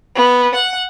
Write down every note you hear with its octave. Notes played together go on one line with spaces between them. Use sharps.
B3
F#5